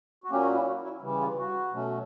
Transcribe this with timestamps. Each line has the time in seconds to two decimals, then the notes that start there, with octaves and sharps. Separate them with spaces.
0.24 F#4
0.30 A#2 F#3 A#3 C#4 G4
0.43 F#4
0.54 E4
0.66 F#4
0.83 E4
1.02 C#3 E3 G3
1.20 F4
1.38 F#4
1.73 B2 F#3 A3 C#4